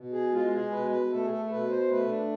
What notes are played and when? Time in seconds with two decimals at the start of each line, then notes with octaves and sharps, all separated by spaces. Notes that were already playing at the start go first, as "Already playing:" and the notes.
Already playing: B2
0.12 G#4
0.32 G#3 F4
0.52 G#4
0.71 B2 B4
0.91 B4
1.11 A3 A4
1.24 G#4
1.30 A4
1.46 A4
1.50 B2 B4
1.70 C5
1.89 A3 B4
2.09 D4